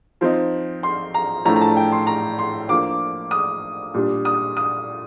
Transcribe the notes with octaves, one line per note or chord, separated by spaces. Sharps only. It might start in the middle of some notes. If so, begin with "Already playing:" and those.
F3 C4 D#4
C6
A#5
A2 F3 A3 D4 A#5
A#5
A5
G5
C6
A#5
C6
F3 A#3 D4 D6
D#6
A#2 G3 D4
D#6
D#6